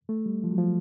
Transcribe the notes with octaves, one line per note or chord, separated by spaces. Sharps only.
A3
G3
F3
F#3
F3